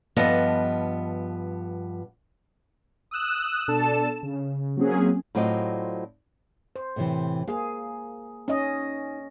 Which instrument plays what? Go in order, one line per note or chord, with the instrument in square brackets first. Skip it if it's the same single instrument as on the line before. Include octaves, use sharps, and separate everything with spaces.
[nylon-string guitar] G2 F3 B3 A4 D#5
[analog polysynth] D#6 E6 F#6 E7
B2 D4 A4 A5 E7
C#3
F#3 A#3 C4 C#4 G#4
[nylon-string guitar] A2 F#3 C4 F4 D5 D#5
[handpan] C5
[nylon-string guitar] A2 C3 E3
[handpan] A#3 G#4 [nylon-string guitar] F5
[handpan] C#4 D#5 [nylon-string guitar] D#4